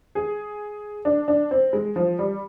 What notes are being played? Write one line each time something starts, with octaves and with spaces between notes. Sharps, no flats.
G#4
D4
D4
C4
G#3
F3
G3